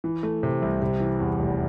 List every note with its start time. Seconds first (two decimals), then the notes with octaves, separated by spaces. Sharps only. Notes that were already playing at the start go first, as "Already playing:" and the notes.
0.04 E3
0.23 A3
0.43 C3
0.62 C2
0.82 C3
1.00 E3
1.20 E2
1.40 F1